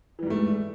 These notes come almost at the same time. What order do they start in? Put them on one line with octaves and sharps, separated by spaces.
E3 G3 G#2 A3